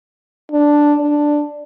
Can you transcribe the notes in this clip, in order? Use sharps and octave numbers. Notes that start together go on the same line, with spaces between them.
D4
D4